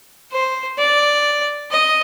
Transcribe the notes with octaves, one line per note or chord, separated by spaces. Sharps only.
C5
D5
D#5